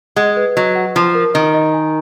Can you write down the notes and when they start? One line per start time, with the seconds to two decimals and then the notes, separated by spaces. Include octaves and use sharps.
0.16 G#3 F#5
0.36 B4
0.56 F#3 D#5
0.75 F#5
0.95 F3 A#5
1.15 A#4
1.34 D#3 D#5
1.54 D#5
1.73 G#5